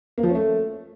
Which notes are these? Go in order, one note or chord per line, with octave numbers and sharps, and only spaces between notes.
A#3
F3
C#4
A3